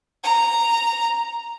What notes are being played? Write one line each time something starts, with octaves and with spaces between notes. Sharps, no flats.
A#5